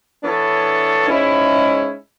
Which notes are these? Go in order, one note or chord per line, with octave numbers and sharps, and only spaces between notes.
E3 B3 D4 A4 C#5
G#2 G#3 C#4 E4